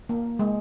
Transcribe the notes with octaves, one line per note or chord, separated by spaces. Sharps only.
A#3
G#3